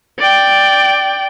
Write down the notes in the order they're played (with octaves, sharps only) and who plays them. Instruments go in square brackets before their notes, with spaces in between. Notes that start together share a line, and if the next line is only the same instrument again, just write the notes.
[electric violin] D5 G5